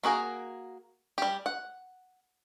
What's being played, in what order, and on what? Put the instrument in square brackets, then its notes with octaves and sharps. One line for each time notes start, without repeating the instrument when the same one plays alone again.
[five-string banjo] A#3 F#4 G#4 A#4
G3 G4
F#5